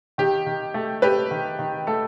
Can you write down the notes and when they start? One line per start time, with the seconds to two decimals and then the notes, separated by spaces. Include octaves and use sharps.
0.18 D#3 G4
0.46 D#3
0.74 A3
1.02 A3 G4 B4
1.31 D#3
1.59 D#3
1.87 A3 A4